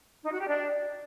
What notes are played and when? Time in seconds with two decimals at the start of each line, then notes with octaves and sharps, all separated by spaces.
0.24 D#4
0.32 F#4
0.40 G4
0.47 D4